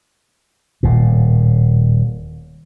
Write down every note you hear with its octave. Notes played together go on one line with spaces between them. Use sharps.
D#1 A2